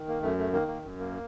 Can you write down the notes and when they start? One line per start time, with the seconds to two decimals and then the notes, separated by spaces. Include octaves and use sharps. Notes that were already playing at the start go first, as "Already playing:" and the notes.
Already playing: D#3
0.08 A#3
0.22 F#2 A3
0.38 A3
0.53 D#3 A#3
0.68 A#3
0.84 F#2
0.99 A#3